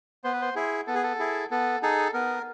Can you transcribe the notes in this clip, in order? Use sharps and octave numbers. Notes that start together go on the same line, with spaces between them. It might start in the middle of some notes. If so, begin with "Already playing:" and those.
B3 C5
B4
C5
E4 G#4
B3 A4
G#4
A4
E4 G#4
B3 A4
D#4 G#4 A4
B3 A#4